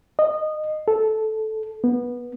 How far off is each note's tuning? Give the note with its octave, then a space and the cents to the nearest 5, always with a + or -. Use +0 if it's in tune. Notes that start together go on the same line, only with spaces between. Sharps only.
D#5 -20
A4 -10
B3 -20